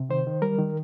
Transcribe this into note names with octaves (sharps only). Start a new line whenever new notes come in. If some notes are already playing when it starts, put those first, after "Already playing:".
Already playing: C3
D#3 C5
D#3
G3 A#4
D#3